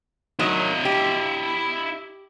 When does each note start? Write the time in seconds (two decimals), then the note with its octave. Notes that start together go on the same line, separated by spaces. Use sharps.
0.39 D#3 F#3 E4 D#5
0.85 G4